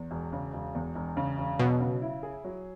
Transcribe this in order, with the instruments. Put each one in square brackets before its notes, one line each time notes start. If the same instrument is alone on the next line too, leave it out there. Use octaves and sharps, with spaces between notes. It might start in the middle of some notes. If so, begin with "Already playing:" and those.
Already playing: [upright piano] E2
E1
C#3
E1
E2
E1
C#3
E1
[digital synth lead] B2 [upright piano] F#3
[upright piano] C#3
E4
G#4
F#3